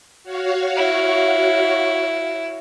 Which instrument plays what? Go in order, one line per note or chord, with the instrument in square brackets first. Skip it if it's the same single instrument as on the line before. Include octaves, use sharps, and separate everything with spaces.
[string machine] F#4 C#5 F5
[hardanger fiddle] E4